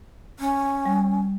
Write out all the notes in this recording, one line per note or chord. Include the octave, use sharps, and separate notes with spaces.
C#4
G3